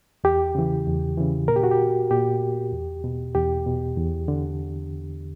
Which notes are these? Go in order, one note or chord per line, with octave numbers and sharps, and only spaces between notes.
E2 G4
C#3 E3
E2
C#3 E3
A#2 A#4
G4
F#4
G4
A#2 G4
E2
B2
E2 G4
B2
E2
D3